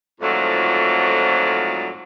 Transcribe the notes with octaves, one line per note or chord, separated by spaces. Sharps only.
F2 G#2 D3 F3 F#3 A3